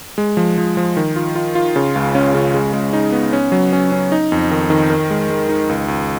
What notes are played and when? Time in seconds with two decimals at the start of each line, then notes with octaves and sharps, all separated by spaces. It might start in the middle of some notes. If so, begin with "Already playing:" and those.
0.18 G#3
0.37 F3
0.58 F3
0.77 F3
0.97 D#3
1.16 F4
1.36 F4
1.55 F4
1.76 C#3
1.96 C#2
2.15 C#4
2.34 C#3
2.54 G#3
2.73 G#3
2.93 D#4
3.12 B3
3.33 C#4
3.52 F#3
3.73 C#4
3.92 C#4
4.12 D#4
4.32 F2
4.51 D#3
4.70 D#3
4.90 A#4
5.10 G#3
5.30 G#3
5.49 D#4
5.69 C#2
5.88 C#2